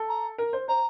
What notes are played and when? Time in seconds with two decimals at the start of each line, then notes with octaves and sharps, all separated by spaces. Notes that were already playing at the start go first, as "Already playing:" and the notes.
Already playing: A4
0.08 A#5
0.38 A#4
0.53 C5
0.68 C5 A#5